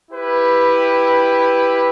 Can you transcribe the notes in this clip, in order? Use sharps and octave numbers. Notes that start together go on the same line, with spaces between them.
E4 G4 B4